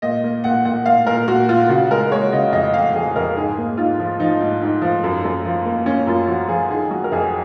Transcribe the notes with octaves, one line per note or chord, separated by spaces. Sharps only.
A#2 D#5
A#3
A#2 F#5
A#2 F#5
A#2 F5
A#2 A#4
A#2 F#4
A#2 F4
C#3 F#4
G#3 A#4
G#3 C#5
C#3 D#5
F2 D#5
F2 F5
F2 G#4
F2 A#4
G#2 G#4
A#3
G#2 F4
F3
F3 D#4
G#2
G#2
F3
F#2
F#2
F3
A#3
A#3 C#4
F#2 F4
F3 F#4
F3 G#4
D#3 G#4
F#3 F#4
A#4
F2 G#4